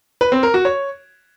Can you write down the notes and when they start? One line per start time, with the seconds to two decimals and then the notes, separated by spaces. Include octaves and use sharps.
0.21 B4
0.32 C4
0.43 A#4
0.54 F#4
0.65 C#5